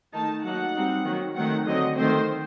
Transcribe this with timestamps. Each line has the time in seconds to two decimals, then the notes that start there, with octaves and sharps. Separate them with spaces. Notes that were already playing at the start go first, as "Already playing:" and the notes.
0.13 D#3 A3 D#4 A5
0.44 F#3 A#3 D#4 F#5
0.74 G3 C4 D#4
1.04 D#3 F#3 A#3
1.36 D#3 F#3 A3 C4 F#5
1.66 D3 F#3 C4 D#5
1.97 D#3 A3 C4 C5